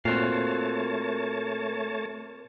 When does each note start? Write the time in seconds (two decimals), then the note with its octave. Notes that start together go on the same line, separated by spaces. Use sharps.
0.05 A#2 A3 C4 F#4 A#4 C#5 F5 A5